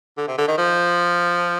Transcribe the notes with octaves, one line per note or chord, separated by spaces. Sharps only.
D3
C3
D3
D#3
F3